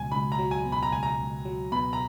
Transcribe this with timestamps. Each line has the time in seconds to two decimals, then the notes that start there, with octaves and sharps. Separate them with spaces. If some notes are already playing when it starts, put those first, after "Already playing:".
Already playing: C#2 B2 F#3 G#5
0.12 C#2 B5
0.32 A#5
0.39 F#3
0.51 G#5
0.65 B2
0.72 B5
0.83 A#5
0.92 C#2 G#5
1.03 A#5
1.19 C#2
1.45 F#3
1.72 B2 B5
1.93 A#5